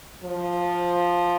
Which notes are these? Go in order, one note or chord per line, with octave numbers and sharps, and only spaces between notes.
F3